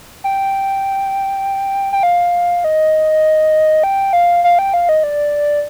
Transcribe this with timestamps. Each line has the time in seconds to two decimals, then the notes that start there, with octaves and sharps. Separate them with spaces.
0.24 G5
1.93 G5
2.03 F5
2.64 D#5
3.83 G5
4.13 F5
4.44 F5
4.59 G5
4.74 F5
4.89 D#5
5.04 D5